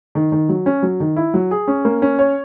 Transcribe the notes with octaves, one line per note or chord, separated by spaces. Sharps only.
D#3
D#3
F#3
C#4
F#3
D#3
E4
F#3
G#4
C#4
A#3
C#4
C#5